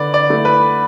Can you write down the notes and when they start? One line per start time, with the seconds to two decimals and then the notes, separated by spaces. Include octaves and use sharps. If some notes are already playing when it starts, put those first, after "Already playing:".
Already playing: D3 B4 D5
0.14 D5
0.30 A3 E4
0.45 B4